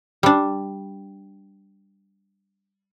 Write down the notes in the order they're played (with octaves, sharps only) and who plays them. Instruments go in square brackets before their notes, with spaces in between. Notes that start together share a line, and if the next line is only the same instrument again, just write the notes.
[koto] G3 D4